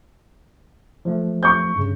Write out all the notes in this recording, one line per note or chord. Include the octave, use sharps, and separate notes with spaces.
F3 A3
C#6 G6
G2 C#3